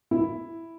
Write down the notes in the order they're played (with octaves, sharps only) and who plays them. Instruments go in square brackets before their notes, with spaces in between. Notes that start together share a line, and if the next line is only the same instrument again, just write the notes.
[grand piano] E4